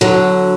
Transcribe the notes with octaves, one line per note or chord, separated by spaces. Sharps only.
D3 F#3 F#4